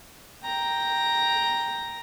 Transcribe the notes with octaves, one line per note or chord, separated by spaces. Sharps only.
G5 A#5